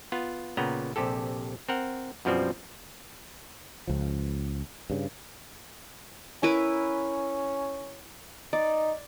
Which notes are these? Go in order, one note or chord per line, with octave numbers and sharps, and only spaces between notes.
B3 F4
A#2 C#3 B3 G5 A#5
A#1 C3 G4 A4
C4 A#4 F#5
F#2 B2 F3 G3 C4
C#2 F3
G2 C#3
C#4 E4 A#4 B4
D#4 D5